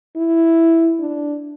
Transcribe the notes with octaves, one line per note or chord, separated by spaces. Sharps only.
E4
D4